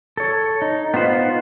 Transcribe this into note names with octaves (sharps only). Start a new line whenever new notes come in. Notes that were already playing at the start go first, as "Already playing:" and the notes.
A4 C#5
D#4
B3 D#4 F4 C5 F#5